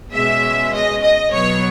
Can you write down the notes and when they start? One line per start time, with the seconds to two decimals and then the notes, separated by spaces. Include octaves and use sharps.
0.12 B2 G#3 C#4 E5
0.73 D#5
1.02 D#5
1.32 B2 F#3 B3 C#5